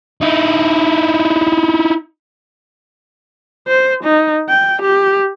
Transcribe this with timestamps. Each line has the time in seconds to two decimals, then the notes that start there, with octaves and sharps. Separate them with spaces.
0.21 D#4 E4
3.68 C5
4.04 D#4
4.49 G5
4.82 G4